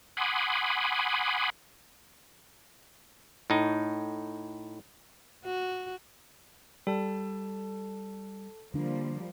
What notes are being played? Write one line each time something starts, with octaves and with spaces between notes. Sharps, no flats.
F#5 G#5 B5 C6 D6 D#6
A2 D#4
F#4
G3 A4 A5
D3 F3 G3 A#3 D4